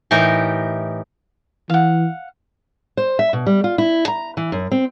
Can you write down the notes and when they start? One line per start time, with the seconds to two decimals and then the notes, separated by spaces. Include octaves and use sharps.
0.11 A2 E3 D#4 G4 A#4
1.70 E3 F5 F#5
2.97 C5
3.19 E5
3.33 B2
3.47 G3
3.64 F4
3.78 E4
4.08 A#5
4.37 E3
4.52 F#2
4.72 C4